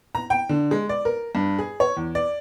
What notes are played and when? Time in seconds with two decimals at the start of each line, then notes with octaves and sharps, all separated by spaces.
0.15 A#5
0.30 G5
0.49 D3
0.71 G#3
0.89 D5
1.05 A#4
1.35 G2
1.58 G#4
1.80 C#5
1.97 E2
2.15 D5